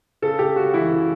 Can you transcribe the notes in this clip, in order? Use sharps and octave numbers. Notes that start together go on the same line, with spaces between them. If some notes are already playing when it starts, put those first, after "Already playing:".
C#3 A4
C#3 G4
C#3 F#4
E3 E4
C#3